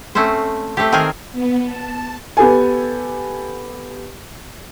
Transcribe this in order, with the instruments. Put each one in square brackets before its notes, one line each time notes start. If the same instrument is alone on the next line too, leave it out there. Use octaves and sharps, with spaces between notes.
[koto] A3 C4 C#4 C5
A3 C4 G4
D#3 C4 G#4 A#4 G#5
[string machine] B3
A5
[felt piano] B3 G4 A4 G#5